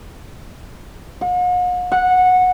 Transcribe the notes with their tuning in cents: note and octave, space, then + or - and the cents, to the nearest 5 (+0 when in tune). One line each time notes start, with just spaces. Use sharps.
F#5 -45
F#5 -15